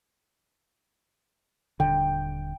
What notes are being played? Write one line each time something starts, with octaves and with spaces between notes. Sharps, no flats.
D#1 D3 G5